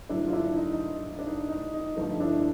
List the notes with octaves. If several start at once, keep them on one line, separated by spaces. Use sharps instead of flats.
G2 D3 F#3 A3 D4 E4
F4
D4 E4
D#4
D#4
D4
D#4
D#4
D#4
G2 D3 F3 A3 D#4
D4 E4